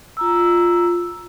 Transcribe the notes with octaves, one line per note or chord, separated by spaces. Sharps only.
F4 A#5 E6